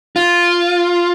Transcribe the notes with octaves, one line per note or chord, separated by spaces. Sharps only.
F4